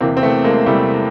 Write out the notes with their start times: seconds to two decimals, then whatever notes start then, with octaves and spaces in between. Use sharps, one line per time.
0.01 E2 C3 E3 A#3 C4
0.17 C4
0.23 A3 B3
0.44 G#3 A#3
0.66 E2 C3 E3 G3 A3